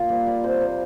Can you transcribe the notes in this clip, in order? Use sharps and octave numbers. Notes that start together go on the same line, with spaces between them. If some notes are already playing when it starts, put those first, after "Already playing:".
Already playing: A#2 F4 F5
G3 D5
G3 D5
C3 C5
C3